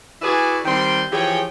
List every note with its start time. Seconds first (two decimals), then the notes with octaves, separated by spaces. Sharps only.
0.22 E4 F#4 G#4 B4 D5 G#5
0.65 D#3 G3 C4 G5 C6
1.11 E3 F3 G4 G#4 C#5 G5